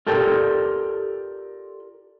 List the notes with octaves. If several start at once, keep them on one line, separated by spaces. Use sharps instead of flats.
F4 G4 A4 A#4 D5 G5